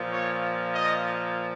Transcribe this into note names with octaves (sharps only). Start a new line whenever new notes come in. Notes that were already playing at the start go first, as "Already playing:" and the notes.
Already playing: A#2 F3
C#5
D#5